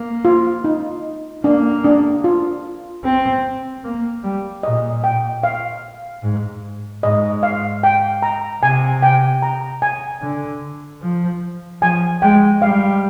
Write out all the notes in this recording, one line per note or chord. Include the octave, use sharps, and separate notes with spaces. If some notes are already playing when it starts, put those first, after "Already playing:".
Already playing: A#3
F4
D#4
A#3 D4
D4
F4
C4
A#3
G3
A#2 D#5
G5
F5
G#2
G#2 D#5
F5
G5
A#5
C3 G#5
G5
A#5
G#5
D3
F3
F3 G#5
G#3 G5
G3 F5